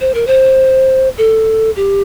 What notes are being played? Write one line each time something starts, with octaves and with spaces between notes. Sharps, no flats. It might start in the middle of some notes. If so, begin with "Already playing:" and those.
C5
A#4
C5
A4
G4